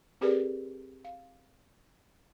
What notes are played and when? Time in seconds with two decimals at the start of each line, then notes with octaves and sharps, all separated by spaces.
0.21 C4 G4 G#4 A#4 B4 D5
1.04 F5